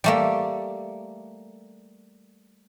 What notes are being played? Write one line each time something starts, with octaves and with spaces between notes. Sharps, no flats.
G3 A3 A#3